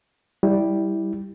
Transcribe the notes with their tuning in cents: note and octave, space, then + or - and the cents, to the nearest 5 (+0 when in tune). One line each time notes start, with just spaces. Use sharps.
G3 +0 E4 -15